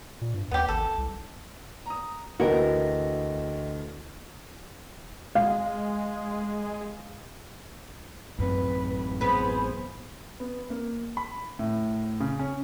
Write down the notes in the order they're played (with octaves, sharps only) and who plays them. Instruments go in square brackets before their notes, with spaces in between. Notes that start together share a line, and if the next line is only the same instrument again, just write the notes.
[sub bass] A#2
G2
[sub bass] D#2 [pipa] B3 G4
[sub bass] G#1 [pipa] A4
[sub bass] C2
[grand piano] A#5 D#6
[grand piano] D2 [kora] E3 [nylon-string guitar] F#4 A#4 [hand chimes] D#5 G5 A#6
[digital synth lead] G#3 [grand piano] F5
[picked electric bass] A1 C4 [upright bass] F#2 [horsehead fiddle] B4
[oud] B3 B4 [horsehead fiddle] G#4 C5
[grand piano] B3
A#3
B5
A2
C#3
C#4